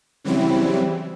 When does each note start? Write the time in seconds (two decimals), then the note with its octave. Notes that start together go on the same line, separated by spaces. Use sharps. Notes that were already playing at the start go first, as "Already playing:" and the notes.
0.24 C#3 E3 F#3 G3 C4 E4